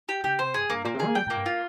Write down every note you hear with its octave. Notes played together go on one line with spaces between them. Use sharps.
G4
C#3 G4
C3 C5
G2 G#4
G2 A#3
A#2 A#3
C3
G#4
A#3
G3 G5
A#2 A#3
G2
F4